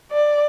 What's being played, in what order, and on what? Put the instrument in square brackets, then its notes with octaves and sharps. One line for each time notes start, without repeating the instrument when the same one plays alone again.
[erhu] D5